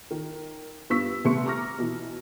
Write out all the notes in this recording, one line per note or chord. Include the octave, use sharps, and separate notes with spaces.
D#3
G2 B3 C#6 E6 B6
C2 A3 B3 C6 C#6 C#7
A#5 C#6 D6 F6 A#6
B2 E3